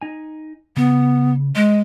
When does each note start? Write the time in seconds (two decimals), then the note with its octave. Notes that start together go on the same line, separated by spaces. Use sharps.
0.01 D#4 G#5
0.77 C#3 B3
1.55 G#3 D#5